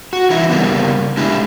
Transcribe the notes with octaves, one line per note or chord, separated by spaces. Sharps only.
F#4
E3 D#4 E4
C#3 G3 A#3 B3
G#3 D4 E4 G4